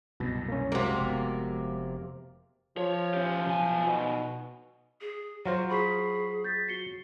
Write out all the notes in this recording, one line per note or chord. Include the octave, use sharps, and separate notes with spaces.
C2 F#2 B2
A#3 C#4
C3 G#3 A#3 F#4
F1 F2 B3
F3 C#5
C#4 G4
B1 G#5
B2
G#4
F#3 F4 F#4 C5
G#4 B5 C#6 B6
G6 A6 B6
F#4 C7 C#7 G7